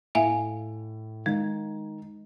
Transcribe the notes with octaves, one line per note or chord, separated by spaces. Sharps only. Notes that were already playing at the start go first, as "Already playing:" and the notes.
A2 E5 F5 G#5
D#3 G#3